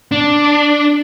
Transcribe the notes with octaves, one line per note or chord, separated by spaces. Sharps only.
D4